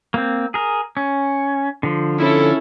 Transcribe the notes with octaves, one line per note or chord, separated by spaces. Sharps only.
A#3 C4
G#4 A#4
C#4
D3 F3
C#4 E4 A4